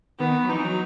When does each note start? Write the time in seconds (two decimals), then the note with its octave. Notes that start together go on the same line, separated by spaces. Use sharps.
0.19 D#3 B3
0.43 F#3
0.49 E3 D#4
0.65 F#3